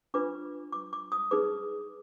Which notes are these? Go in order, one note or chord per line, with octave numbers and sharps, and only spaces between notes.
D4 F4 B4 D6
D6
D6
D#6
D#4 G#4 B4 D6